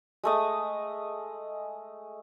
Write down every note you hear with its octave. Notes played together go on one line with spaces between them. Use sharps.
G#3 A3 D#5